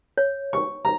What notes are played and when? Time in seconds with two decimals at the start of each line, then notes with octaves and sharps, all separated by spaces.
0.18 C#5
0.53 C#6
0.85 A#5